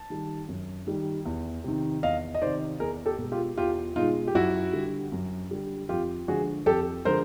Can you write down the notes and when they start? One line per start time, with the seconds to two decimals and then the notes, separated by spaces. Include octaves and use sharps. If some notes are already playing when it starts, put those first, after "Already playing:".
Already playing: A5
0.10 D#3 G3
0.48 F#2
0.87 D#3 G3
1.26 E2
1.64 C3 D#3
2.03 E2 D#5 F5
2.35 D#5
2.41 C3 D#3 C5 D5
2.80 E2 G#4 A#4
3.06 G4 A4
3.18 B2 G#3
3.32 F4 G4
3.58 E2 F4 G4
3.96 B2 G#3 D#4 F4
4.27 G4
4.35 F#2 E4 F#4
4.73 D3 G3
5.12 F#2
5.51 D3 G3
5.89 F2 F4 G4
6.28 D3 F3 G#3 F#4 G#4
6.66 F2 G4 A4
7.05 D3 F3 G#3 A#4 C5